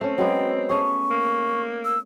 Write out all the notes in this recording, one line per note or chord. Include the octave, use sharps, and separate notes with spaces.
A3 C4 C#4
F#3 G#3 B3 G5
A3 C#4 G#4 C#6
A#3
E6